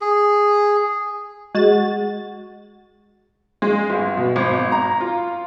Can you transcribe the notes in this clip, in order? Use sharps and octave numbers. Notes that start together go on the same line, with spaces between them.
G#4
G#3 F#4 A6
G#3
G1
B2
G#1
A#5
F4